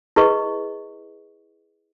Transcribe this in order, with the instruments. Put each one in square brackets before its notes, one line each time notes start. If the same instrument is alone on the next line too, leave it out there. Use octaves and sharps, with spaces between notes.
[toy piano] E4 G#4 B4 D#5 C#6